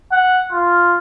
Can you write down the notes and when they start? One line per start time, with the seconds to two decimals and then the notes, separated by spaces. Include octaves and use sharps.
0.12 F#5
0.52 F4